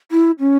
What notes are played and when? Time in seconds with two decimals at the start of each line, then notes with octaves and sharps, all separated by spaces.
0.11 E4
0.40 C#4